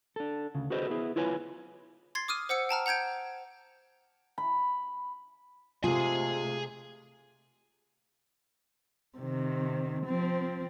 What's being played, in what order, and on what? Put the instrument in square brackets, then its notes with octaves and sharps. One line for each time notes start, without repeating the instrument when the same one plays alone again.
[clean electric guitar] D4 A4
D2 C#3
F#4 G#4 A4 B4 C5 D#5
B3 E4 G#4
E4 F4 B4 C#5 G#5
[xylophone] C6 G#6 A6 C7
D6 D#6 F6 D#7
C5 F#5 E6 C#7
G5 A5 A#5 F6
F#5 A#5 G6 G#6 D7
[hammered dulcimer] B5
[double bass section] C3 G#3 A3 [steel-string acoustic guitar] F4 [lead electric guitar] G#4 G#5
[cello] C3 D#3
F3 C4